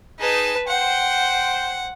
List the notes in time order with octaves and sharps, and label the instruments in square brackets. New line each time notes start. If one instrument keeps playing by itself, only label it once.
[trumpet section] D#4 G#4 [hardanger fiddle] B4 A5
[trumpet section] C5 G5 [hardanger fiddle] F#5